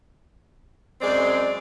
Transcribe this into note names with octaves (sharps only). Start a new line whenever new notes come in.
F#2 G#3 C4 D5